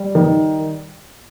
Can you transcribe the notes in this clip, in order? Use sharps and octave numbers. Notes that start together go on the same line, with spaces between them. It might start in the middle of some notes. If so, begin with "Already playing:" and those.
Already playing: G3
D#3